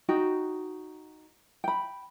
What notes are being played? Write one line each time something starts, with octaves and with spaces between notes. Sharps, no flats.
D#4 F#4 G5
G5 B5